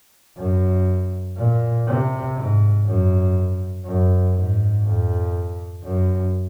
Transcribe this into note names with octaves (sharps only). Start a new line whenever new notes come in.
F#2
A#2
C3
G#2
F#2
F#2
G#2
F2
F#2